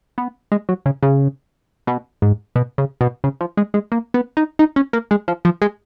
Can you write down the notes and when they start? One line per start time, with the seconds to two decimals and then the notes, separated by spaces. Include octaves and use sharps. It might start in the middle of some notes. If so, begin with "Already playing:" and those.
0.18 B3
0.52 G#3
0.69 F#3
0.86 C#3
1.03 C#3
1.87 B2
2.22 G#2
2.56 B2
2.78 C#3
3.01 B2
3.24 C#3
3.41 F3
3.57 G#3
3.74 G#3
3.92 A#3
4.14 B3
4.37 D#4
4.59 D#4
4.76 C#4
4.93 A#3
5.11 G#3
5.28 F3
5.45 F3
5.62 G#3